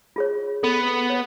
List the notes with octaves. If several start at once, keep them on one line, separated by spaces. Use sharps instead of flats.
F4 G#4 C#5
B3 A4
C#5